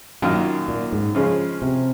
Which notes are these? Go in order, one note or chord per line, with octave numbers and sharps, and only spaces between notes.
F#2 A#2 D#3 A#3 F4
A#2
G#2
C#3 F3 G#3 C#4
C3